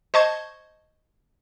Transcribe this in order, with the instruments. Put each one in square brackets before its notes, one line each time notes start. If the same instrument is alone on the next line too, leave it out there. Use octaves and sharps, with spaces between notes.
[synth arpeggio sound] C5 D#5 A5 C#6 G#6